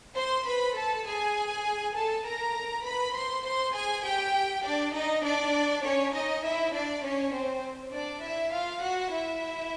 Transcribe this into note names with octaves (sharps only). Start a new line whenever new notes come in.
C5 C6
B4 B5
A4 A5
G#4 G#5
A4 A5
A#4 A#5
B4 B5
C5 C6
C5 C6
G#4 G#5
G4 G5
D4 D5
D#4 D#5
D4 D5
C#4 C#5
D#4 D#5
E4 E5
D4 D5
C#4 C#5
C4 C5
D4 D5
E4 E5
F4 F5
F#4 F#5
E4 E5